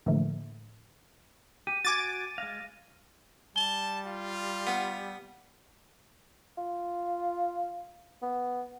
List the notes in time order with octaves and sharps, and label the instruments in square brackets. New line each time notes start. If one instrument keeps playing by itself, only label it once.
[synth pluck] A2 D3 E3 F3 A3 A#3
[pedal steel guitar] G4 [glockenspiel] D#7
[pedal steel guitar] F#4 G#5 [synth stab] D6 A6
[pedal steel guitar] G#3 F5 [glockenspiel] A#6
[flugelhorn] G3 [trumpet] A5 [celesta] G7
[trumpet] F4
[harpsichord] B3
[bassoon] F4
B3